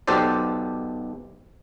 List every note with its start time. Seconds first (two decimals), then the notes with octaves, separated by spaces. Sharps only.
0.07 B1 B2 G4 A4 C5 D5